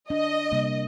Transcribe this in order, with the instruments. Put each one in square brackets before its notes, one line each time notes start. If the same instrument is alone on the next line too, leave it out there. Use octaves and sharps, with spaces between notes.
[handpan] D4 [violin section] D#5
[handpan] C3 G3 A#3